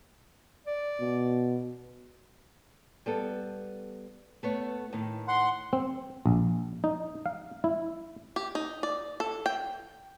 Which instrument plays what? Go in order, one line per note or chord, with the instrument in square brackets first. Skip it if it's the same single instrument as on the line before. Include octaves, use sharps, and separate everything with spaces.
[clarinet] D5
[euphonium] B2
[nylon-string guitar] G3 B3 A4
A3 B3 C#5
A2 D#3
[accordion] F#5 C6
[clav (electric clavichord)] C4
A#1
D#4
F5
E4
[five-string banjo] G4
D#4
D5
A4
G5